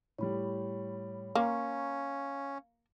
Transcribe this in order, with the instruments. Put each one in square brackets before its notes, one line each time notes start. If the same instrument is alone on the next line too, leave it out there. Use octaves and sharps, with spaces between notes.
[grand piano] A2 G3 [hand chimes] C#5 B5
[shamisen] A#3 [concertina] C#4 [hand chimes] F5 [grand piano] A#5 C6 C#6